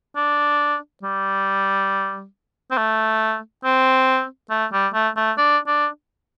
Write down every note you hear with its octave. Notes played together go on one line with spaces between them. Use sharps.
D4
G3
C4
A3
C4
A3
G3
A3
A3
D4
D4